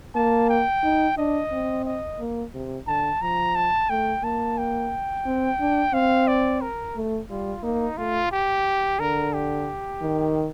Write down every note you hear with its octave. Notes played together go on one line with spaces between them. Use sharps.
A#3 A5
G5
D#4
D4 D#5
C4
D#5
A#3
C3
D3 A5
F3 A#5
A5
A3 G5
A#3 A5
G5
C4
D4
C4 F5
D5
A#4
A3
G3 F4
A#3 D#4
A3 F4
G4
D3 A#4
G4
D#3